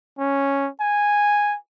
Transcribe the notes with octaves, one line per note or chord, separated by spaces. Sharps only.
C#4
G#5